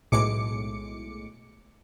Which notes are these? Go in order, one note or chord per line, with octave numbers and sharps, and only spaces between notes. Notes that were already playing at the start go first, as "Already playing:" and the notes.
B1 A2 G#3 D6 C#7